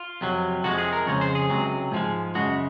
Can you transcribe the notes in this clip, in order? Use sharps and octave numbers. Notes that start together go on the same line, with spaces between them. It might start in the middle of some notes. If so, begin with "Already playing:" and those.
Already playing: F4
F2 C3 F#3
F2 C3 F3 G#3 F#4
G#4
A#4
F2 C#3 G#3 C#5
C5
G#4
C#2 C3 F#3
G#2 F3 G#3
F#2 C#3 G#3 F#4